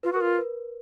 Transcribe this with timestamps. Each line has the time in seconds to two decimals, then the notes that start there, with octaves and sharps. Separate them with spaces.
0.03 F4 B4
0.12 F#4 A#4
0.21 F4
0.27 A#4
0.39 B4